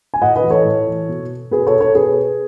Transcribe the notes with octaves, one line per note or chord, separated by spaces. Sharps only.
G#5
A2 D#5 F#5
B4 D#5
E3
A4 C#5
A2
E3
B2
B2 G#4 B4
A4 C#5
A4 C#5
B2 G#4 B4